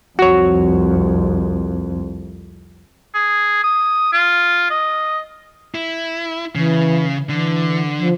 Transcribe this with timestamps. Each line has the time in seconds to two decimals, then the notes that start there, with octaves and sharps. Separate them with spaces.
0.19 C2 F2 F#4 C#5
3.15 G#4
3.64 D#6
4.13 F4
4.70 D#5
5.75 E4
6.55 C#3 E3
7.29 D3 E3
7.99 F3